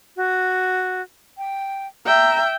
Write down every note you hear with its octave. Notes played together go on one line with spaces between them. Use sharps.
F#4
G5
E5 G5 A#5